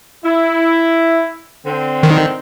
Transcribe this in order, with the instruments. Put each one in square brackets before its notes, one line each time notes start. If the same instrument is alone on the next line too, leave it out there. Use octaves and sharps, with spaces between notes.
[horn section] E4
D3 C4
[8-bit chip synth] D#3